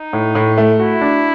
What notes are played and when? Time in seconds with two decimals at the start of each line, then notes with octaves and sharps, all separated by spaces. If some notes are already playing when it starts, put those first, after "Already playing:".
Already playing: D#4
0.13 A2
0.35 A2
0.58 A3
0.79 E4 F#4
1.01 D4